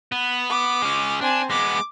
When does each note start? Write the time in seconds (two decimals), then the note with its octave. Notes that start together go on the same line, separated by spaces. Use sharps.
0.12 B3
0.50 D6
0.82 G#3 C#4
1.21 C4 D4 G#5
1.50 G#3 B3 D6